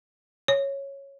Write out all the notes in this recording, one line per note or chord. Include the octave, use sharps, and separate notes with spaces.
C#5